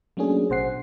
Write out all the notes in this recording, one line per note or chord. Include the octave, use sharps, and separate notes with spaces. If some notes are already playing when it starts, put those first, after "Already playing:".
F#3 A3 A#3 C#4 D4 G#4
A1 B2 C5 F#5 C7